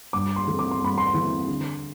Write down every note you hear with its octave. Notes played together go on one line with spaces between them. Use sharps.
G2 D6
C6
E3 A3 C4
D6
C6
G2 B5
C6
E3 A3 C4
D3